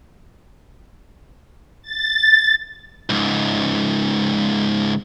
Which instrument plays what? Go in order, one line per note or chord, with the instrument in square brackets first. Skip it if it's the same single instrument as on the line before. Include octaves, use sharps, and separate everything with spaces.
[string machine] A6
[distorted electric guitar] C#2 G#2